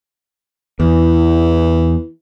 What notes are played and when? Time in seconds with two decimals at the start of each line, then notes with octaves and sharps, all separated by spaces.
0.80 E2 E3